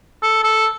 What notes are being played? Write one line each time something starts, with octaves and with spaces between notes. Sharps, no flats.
A4
A4